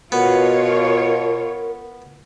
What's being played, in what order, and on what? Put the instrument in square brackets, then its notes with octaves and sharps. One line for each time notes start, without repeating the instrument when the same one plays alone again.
[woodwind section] B2 [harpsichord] B3 [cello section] F4 C#5 [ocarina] A#4